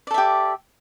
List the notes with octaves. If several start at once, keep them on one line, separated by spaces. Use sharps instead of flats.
G4 A4 D5 E5